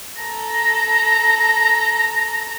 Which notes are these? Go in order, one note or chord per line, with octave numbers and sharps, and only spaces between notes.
A4 A#5